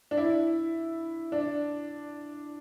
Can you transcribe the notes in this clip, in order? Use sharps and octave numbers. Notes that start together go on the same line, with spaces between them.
D4
E4
D4